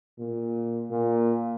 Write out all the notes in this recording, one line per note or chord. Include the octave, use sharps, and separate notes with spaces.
A#2
A#2